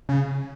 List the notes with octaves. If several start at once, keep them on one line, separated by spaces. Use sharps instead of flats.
C#3